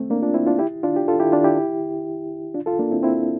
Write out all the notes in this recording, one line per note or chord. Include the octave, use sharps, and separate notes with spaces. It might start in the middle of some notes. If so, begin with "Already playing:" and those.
Already playing: A3 C4
A#3 D4
D4 F4
C4 E4
D4 F4
E4 G4
D4 F4
G4
F4 A4
E4 G4
D4 F4
E4 G4
D4 F4
F4 A4
A#3 D4
C4 E4
C4 E4